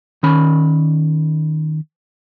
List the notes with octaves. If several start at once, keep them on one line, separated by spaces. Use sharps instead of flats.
D#3 C#4 B5